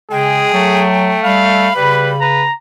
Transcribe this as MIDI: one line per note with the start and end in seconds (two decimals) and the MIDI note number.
0.11 0.46 49
0.11 0.53 56
0.11 0.85 68
0.11 1.21 79
0.53 1.17 54
0.53 1.69 57
1.24 1.69 55
1.24 1.73 77
1.24 2.26 83
1.76 2.48 49
1.76 2.15 55
1.76 2.12 71
2.21 2.44 71
2.21 2.54 82